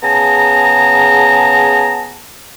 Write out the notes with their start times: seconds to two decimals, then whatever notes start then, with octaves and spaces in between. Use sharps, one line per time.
0.03 C#3 B3 G#4 A5 A#5